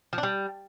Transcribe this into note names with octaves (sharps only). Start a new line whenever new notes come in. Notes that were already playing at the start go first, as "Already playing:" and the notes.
F3
D4
G3